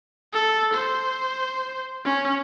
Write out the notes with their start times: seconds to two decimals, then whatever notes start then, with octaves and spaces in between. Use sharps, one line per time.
0.33 A4
0.74 C5
2.05 C#4